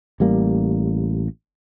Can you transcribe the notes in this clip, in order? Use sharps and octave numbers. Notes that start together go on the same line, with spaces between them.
A1 G3 A#3